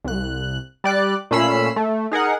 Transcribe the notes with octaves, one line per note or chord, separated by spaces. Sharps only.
C2 F#6
G3 D5 F#6
A#2 A3 C#4 B5 E6 C7
A3
D#4 G#4 A#4 F#5